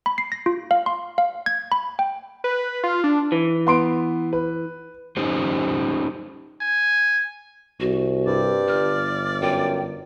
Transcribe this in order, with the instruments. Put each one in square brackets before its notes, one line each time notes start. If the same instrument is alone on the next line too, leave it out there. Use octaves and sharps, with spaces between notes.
[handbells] B5
C7
A#6
F4
F5
C6
F5
G#6
B5
G5
[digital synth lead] B4
F4
D4
[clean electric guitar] E3
[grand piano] B3 C6 D7
B4
[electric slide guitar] C#4 D#4 G4 C5
[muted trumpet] G#5
[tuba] C2 [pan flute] F#4
[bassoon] G2 [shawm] D5
[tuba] G1 [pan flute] F6
[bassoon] F#2 [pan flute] G5